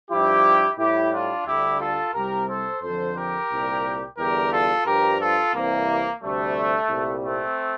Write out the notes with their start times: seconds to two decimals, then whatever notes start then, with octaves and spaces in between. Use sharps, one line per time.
0.10 G2 F3 E4 G4
0.78 A2 G3 E4 G4
1.13 D4 F4
1.46 D2 D3 G3 E4 G4
1.80 F4 A4
2.14 C2 C3 G3 G4 A#4
2.49 A4 C5
2.82 F2 D3 F3 A4 C5
3.16 G4 A#4
3.51 C2 A#2 G3
4.18 E2 D3 G3 G4 A#4
4.52 F4 A4
4.86 G2 F3 G4 A#4
5.20 F4 A4
5.54 C2 C3 E3 A#3
6.22 D2 C3 G3 A3
6.90 C2 A#2 G3
7.24 A3 C4